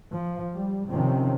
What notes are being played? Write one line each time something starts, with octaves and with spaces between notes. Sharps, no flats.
F3
G3
C3 D#3 F3 C4 C#4